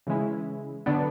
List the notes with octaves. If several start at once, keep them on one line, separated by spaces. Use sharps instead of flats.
C#3 E3 G#3 C#4 E4
D3 F#3 B3 D4